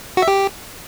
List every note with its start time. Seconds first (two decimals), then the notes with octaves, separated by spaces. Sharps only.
0.17 F#4
0.22 E5
0.28 G4